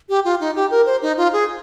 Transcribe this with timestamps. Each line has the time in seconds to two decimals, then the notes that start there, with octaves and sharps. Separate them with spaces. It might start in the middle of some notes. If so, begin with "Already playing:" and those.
0.09 G4
0.25 F4
0.40 D#4
0.56 G4
0.71 A#4
0.86 C5
1.02 D#4
1.17 F4
1.33 G#4